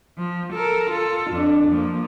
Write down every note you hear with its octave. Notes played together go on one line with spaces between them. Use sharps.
F3
A4 A#4
F4 A4
F2 D4
F3 A#3